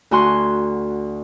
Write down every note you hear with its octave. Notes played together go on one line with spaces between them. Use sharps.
D2 F#4 G#5 C6 F#6